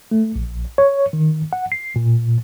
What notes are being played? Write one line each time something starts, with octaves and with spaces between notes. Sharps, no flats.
A3
A#1
C#5
D#3
F#5
C7
A#2